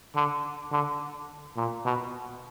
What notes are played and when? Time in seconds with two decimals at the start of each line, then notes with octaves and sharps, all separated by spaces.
0.16 D3
0.72 D3
1.56 A#2
1.85 B2